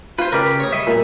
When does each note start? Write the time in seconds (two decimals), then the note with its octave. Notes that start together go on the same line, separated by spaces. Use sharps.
0.19 F4 B4 C5
0.32 C#3 G4 A#4 B4 D5 F6
0.60 C#5 D#6
0.73 G3 D#5 E5
0.87 A#2